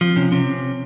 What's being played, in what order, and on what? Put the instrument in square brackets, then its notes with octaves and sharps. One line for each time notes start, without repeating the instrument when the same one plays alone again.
[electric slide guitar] F3 [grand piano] C4
[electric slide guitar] C3 [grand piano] C#4
[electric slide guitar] C3 [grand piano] C#4